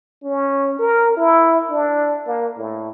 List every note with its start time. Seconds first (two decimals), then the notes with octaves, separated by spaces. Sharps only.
0.23 C#4
0.79 A#4
1.17 E4
1.70 D4
2.27 A#3
2.58 A2